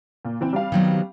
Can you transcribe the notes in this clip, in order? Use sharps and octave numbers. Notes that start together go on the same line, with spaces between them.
A#2
E3 C4
G3 C4 F5
D#3 F#3 B3